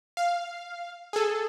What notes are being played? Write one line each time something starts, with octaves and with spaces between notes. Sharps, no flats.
F5
G#4 A4